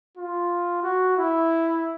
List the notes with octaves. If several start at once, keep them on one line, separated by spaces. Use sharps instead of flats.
F4
F#4
E4